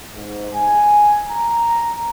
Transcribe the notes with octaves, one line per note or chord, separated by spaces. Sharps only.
G#2
G#5
A#5